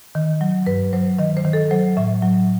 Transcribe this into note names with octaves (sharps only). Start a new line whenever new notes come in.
D#3
F#3
G2 B4
F#3 C5
D#3 D#5
C5
D#3
A4
F#3 C5
A2 E5
F#3